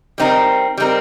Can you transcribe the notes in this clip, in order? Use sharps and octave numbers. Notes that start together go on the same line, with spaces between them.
G3 C4 D#4 A#4
G3 C4 D#4 A#4